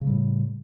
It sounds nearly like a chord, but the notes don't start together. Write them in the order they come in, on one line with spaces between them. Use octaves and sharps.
C#3 A3 G3 A2